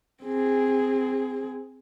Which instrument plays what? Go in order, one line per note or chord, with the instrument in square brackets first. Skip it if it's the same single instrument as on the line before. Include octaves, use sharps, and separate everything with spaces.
[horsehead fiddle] C4 G#4